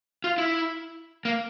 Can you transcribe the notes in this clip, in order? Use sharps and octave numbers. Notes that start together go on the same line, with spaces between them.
F4
E4
A#3